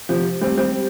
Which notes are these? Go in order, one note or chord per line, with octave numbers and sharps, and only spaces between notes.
C3 F3
G3 C4
G3 C4